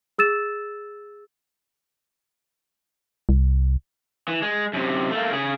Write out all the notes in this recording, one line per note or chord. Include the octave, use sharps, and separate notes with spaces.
G#4 E6 A6 E7
C2
E3
G#3
F#2 C3
A3 A#3
C#3 G#4